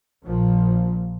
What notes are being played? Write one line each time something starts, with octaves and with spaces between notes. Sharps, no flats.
A#1 A#2 F3